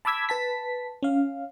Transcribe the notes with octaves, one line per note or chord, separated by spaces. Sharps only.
A5 B5 D6 E6 G#6 B6
B4 A5 B6
C#4 F5